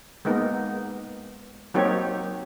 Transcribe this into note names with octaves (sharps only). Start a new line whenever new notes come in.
G#3 A#3 B3 D#4
F#3 A#3 C4 D#4 G4 C#5